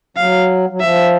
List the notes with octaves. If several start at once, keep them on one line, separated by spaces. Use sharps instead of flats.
F#3 F5
F#3
F3 E5